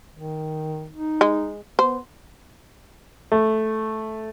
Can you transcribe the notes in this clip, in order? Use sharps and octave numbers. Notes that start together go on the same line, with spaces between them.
D#3
D#4
G#3
B3 C5
A3